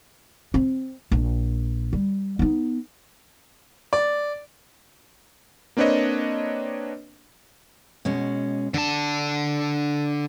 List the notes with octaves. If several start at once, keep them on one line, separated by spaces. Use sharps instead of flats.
C4
A#1
G3
B3 D#4
D5
A#3 C4 D4 B4 C#5 D#5
B2 G#3 C#4
D3 D4 A5